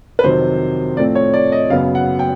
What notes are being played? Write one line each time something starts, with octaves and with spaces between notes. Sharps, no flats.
B4
F2 C3 D#3 F#3 C5
A2 F3 A3 C4 D5
C#5
D5
D#5
F#2 C#3 F#3 B3 F5
F#5
G5